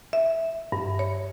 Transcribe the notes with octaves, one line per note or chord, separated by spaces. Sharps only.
E5
G2
C#5